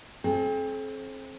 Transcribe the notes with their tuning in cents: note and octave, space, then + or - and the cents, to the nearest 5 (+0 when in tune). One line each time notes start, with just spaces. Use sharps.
C4 +30 A4 -45